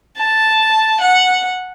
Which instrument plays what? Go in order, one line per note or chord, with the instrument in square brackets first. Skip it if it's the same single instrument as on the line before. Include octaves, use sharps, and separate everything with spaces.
[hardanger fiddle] A5
F#5